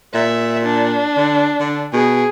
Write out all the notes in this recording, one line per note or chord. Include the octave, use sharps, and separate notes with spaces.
A#2 E5
D4
D3
D3
B2 G#4